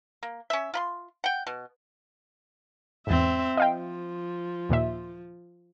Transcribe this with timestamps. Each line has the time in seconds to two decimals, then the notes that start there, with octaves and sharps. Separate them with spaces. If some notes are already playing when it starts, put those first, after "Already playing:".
0.23 A#3
0.50 C#4 E5
0.74 F4 B5 C6
1.24 F#5 G5
1.47 B2
3.07 E2 G#2 C4 E5
3.57 F3 D#5 F5 G5
4.69 D#2 A#2 E5